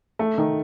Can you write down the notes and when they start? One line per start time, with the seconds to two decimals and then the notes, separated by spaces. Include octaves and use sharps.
0.19 A3
0.38 D#3